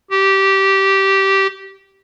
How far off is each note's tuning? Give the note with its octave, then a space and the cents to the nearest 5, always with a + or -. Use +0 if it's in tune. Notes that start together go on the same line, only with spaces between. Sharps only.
G4 -15